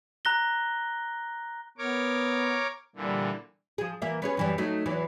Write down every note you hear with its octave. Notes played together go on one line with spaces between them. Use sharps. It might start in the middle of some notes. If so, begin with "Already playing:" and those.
A#5 F#6 A#6 G7
B3 A#4 C#5 D6
A#2 D3 E3 G3
F3 G#4
E3 A#3 E5
B3 C#4 G#4
F#2 E3 G3
F#3 A3 D#4
E2 E3 F#3